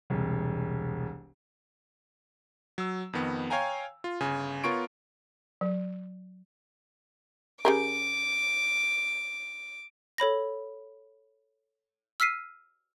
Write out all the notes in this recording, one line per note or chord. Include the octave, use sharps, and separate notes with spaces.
E1 C2
F#3 E6
F2 D#3 B3
C#5 F5 G5 G#5 A#5
F4
G1 C#3 G#5
B3 F4 A#4 C#5 C#6 D7
F#3
C#3 G4 A#4 D6
A4 C#5 B5 A#6
E6 F6 B6 C7 D#7